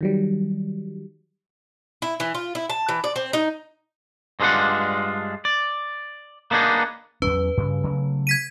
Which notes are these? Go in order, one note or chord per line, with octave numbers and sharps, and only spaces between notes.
D#3 F#3 G3
E4
E3
F4
E4
A5
E3
D5
C4
D#4
G2 G#3 A3 D4 F4 F#5
D5
A#3 B3 D4 D#4 G#4
E2 F#3 C#4 B4
G2 C#3
C#3 F#3 A3
G#6 B6 D#7